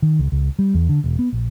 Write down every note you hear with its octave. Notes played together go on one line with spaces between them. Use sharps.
D#3
C#2
C#2
G3
E2
D3
E1
B3
A#1